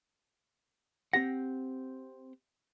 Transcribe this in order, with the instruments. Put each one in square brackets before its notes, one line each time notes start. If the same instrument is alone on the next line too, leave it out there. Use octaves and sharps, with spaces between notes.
[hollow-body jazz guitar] C4 G4 F#5 [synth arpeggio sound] A#6